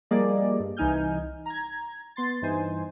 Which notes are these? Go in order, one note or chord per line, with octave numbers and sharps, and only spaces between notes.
F3 G3 A#3 G#4 D5 D#5
G2
C2 E3 D#4 G#5 F6 G6
A#5 G#6
B3 C6 A6
G2 E3 D#4 C5 G#5